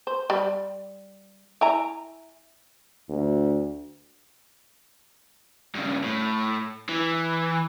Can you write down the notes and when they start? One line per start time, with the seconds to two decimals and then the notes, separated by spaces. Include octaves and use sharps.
0.07 C5
0.30 G3
1.61 E4 G#5 A#5
3.09 D2
5.75 G2 C#3
6.04 A2
6.89 E3